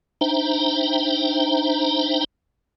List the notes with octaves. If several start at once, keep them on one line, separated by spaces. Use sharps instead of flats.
D4 D#4 C5 E5 G5 A#5